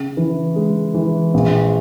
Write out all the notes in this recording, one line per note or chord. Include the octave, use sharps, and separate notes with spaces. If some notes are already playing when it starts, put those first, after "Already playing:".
Already playing: C#3
E3
G#3
E3
A#1